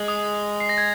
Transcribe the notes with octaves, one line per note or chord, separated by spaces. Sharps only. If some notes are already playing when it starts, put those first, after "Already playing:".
Already playing: G#3
D#6
C7
A#6
G#6